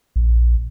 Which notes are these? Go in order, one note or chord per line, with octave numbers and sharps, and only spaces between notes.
A#1